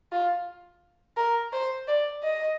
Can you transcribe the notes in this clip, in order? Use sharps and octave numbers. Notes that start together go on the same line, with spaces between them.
F4
A#4
C5
D5
D#5